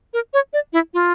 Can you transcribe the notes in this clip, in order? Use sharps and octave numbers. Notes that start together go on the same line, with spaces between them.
A#4
C#5
D5
E4
F4